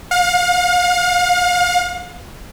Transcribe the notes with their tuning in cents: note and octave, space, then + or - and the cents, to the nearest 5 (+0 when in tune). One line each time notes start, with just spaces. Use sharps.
F5 +35